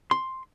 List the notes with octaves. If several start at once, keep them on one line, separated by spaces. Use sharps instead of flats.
C6